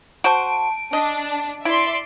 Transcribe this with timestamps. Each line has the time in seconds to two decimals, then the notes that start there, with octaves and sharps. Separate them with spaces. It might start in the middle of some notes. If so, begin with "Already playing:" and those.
0.24 F#4 C5 A5 D7
0.93 D4 D#5
1.65 E4 D5 E5 C6 D7